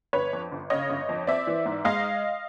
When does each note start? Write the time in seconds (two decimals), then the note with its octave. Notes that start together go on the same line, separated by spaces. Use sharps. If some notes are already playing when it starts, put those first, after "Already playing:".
0.13 G1 B4 C#5
0.33 F2
0.52 G1
0.70 C#3 C#5 D#5
0.90 G1
1.09 F2
1.27 C4 D5 E5
1.47 E3
1.66 G#2
1.85 G#3 D#5 F5